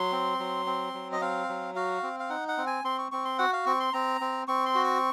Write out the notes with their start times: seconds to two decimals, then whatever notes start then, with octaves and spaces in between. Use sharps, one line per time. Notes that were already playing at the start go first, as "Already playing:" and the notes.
Already playing: F#3 C6
0.12 C4
0.39 F#3
0.66 C4
0.94 F#3
1.12 D#5
1.21 C4 F5
1.48 F#3
1.76 F#4 F5
2.03 C4
2.20 F5
2.30 D#4 F#5
2.48 F#5
2.57 C4
2.67 G#5
2.84 C4 C6
2.99 C#6
3.12 C4 C#6
3.25 C6
3.39 F#4 F#5
3.53 F5
3.66 C4 C#6
3.80 C6
3.93 C4 A#5
4.21 C4
4.48 C4 C#6
4.66 C6
4.75 F#4
4.84 C#6